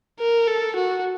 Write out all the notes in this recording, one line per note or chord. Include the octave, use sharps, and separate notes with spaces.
A#4
A4
F#4